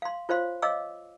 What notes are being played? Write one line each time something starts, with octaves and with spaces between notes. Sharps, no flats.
F5 C6
F4 C5 C#5 F5 C6
C#5 D#5 F5 D6 E6